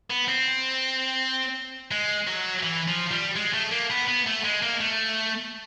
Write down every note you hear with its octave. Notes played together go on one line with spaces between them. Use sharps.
B3
C4
G#3
F#3
E3
F3
G3
G#3
A3
A#3
B3
B3
A3
G#3
A#3
A3